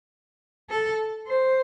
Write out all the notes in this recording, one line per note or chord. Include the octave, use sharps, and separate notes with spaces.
A4
C5